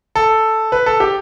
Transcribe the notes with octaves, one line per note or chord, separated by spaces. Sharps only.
A4
B4
A4
G4